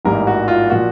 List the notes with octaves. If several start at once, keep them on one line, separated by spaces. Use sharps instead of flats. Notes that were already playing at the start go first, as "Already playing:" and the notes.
A1 G#2 E3 G3 A#3 A#4
F#4
F4
A#2 F3 F#4